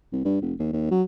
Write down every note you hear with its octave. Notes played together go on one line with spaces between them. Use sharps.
C2
G2
F1
D#2
D#2
F#3